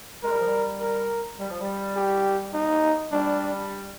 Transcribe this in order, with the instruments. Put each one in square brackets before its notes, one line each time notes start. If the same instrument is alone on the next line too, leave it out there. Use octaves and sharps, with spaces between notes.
[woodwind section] G#3 [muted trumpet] A#4
[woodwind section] G3
F3
G3
[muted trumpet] A#4
[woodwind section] G3
F3
G3
[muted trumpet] G4
D#4
[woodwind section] G3 [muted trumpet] D4